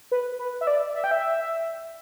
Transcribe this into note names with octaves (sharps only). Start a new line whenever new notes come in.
B4
B4
E5
D5
E5
G5
E5